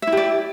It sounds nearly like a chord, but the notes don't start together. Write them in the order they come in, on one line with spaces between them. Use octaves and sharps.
E5 E4 G4 D5